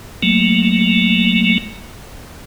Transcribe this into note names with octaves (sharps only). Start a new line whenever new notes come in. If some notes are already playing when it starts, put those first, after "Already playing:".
F#3 A3 A#3